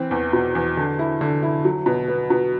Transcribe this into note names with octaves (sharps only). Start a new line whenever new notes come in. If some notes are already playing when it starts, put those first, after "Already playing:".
Already playing: E3 C4
E2
B2
E2
D3
E4
D3
E4
F#3
B2
B3
B2